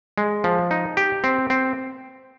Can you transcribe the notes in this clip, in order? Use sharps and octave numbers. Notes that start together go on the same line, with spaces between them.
G#3
F3
D#4
G4
C4
C4